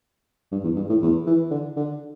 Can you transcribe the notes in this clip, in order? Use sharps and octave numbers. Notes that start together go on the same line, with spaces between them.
G2
E2
G2
A2
E2
E3
D3
D3